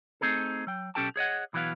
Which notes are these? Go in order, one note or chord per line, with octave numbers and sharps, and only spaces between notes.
A3 C4 D#4 G#4 A4
F#3 G5
B1 C#4 G4 A4 G5 A5
G#4 C#5 D#5 F#5
B1 E3 F#3 B3 F5